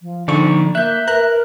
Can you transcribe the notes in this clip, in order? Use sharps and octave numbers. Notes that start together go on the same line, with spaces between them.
F3
D3 F3 D#4 D5 C#6
A#3 E5 F#6 G6
A#4 B4 A#5 F#6